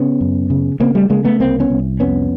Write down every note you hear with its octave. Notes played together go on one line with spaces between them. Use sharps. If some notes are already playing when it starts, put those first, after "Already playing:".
Already playing: C#3 B3 C#4
F#2
C#3
C#3 A#3 C4
G3 A3
C#3 G#3 A#3
A3 B3
C2 A#3 C4
B3 C#4
C2
F2 B3 C#4